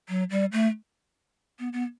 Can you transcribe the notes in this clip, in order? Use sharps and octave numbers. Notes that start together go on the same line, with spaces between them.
F#3
G3
A3
B3
B3